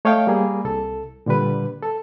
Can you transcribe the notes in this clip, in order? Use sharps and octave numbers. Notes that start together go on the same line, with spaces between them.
A3 C#5 D#5 F5 G5
G3 A#3 G#4
C2 A4
A#2 D3 G3 B4
A4